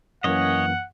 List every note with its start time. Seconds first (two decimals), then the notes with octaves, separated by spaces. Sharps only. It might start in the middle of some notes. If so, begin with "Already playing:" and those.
0.24 F#2 E3 A#3 C#4 C#5 D#5 F#5